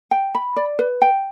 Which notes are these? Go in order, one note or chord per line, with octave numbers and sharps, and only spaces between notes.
G5
B5
D5
B4
G5